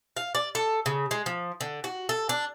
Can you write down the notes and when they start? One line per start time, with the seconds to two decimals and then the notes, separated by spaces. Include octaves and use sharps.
0.17 F5
0.35 D5
0.55 A4
0.86 C#3
1.11 G#3
1.26 F3
1.61 D3
1.84 F#4
2.09 A4
2.29 D4